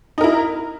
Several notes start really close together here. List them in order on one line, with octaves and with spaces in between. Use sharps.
D#4 A#4 E4